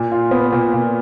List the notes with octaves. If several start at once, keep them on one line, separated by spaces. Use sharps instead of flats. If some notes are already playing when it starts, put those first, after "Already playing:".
Already playing: A#2
F4
B3
A#2
A#2